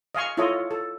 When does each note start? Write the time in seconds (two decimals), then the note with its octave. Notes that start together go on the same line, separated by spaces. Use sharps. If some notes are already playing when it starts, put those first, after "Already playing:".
0.15 D#5 F5 G#5 C#6
0.37 E4 F4 A4 C#5 D#5
0.71 A4